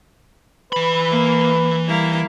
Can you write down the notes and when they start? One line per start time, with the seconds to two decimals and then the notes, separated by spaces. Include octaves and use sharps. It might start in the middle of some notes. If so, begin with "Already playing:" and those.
0.73 E3 B4 B5
1.10 A#3
1.87 G3 A#3 E4